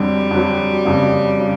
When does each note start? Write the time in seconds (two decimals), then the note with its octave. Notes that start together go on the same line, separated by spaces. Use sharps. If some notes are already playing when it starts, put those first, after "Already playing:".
Already playing: F2 D3 F#3 G3
0.31 F2 D3 F#3
0.85 F#1 F2 C#3 F#3
1.39 C#3 F#3